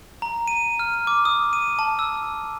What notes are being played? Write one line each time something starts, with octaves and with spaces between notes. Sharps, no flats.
A#5
D#7
F6
D6
D#6
D#7
A5
E6